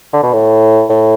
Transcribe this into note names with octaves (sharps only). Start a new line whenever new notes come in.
D3
B2
A2
A2